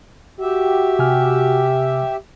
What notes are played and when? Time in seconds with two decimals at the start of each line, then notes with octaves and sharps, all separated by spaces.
0.40 F#4 G4 E5
0.99 C3 G#5 F6